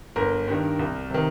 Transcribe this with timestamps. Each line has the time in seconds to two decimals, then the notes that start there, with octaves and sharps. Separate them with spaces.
0.16 G1 A#4
0.48 G2 D#3
0.79 C2
1.10 C3 D#3